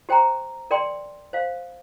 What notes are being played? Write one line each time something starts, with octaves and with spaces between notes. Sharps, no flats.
G4 C5 G5 A#5
A#4 D5 G5 C6
C5 F5